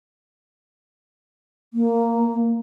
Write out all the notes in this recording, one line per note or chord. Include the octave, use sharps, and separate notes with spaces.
A#3